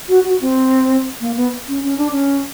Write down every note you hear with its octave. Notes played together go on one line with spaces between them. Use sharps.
F#4
F#4
C4
A#3
B3
C#4
C#4
D4
C#4